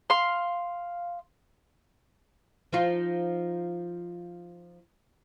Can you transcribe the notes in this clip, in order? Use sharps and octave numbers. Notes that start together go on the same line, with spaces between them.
F5 C6
F3 D#4 F4